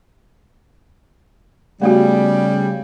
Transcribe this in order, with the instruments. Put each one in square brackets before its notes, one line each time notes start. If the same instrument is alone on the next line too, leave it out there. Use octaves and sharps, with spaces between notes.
[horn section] C#3 G3 [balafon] A3 B3 F#4